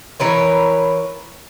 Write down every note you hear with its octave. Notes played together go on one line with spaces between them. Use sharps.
E3 A#4 B4 C#5